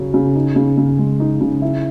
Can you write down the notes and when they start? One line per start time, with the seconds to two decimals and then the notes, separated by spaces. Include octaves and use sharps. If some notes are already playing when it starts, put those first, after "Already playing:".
Already playing: C#3 F#3 C#4
0.14 C#3
0.35 D#4
0.56 C#3
0.78 C#3
0.98 G#3
1.20 D#4
1.41 C#3
1.62 E4